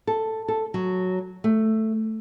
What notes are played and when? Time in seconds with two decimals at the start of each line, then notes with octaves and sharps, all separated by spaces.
0.07 A4
0.48 A4
0.74 F#3
1.44 A3